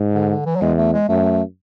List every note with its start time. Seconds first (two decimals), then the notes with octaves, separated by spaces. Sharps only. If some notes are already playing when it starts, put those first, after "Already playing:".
Already playing: G#2
0.14 D3
0.30 D3
0.46 E3
0.56 F#3
0.61 E2 G#3
0.78 A3
0.93 G#3
1.09 F#2 A3